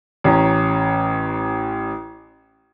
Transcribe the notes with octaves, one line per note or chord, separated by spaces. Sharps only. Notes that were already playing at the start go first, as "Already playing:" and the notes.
A1 C#4 A#5